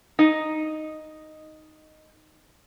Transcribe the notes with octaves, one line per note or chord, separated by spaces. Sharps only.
D#4 D#5